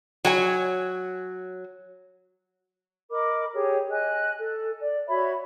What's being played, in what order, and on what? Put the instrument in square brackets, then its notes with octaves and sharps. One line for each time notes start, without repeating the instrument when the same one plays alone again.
[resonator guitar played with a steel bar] F#3 C#5 G#5
[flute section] A#4 D#5 B5 D6
G4 G#4 C#5
D#5 G#5 F#6
A4
D5
F#4 C#5 E5 B5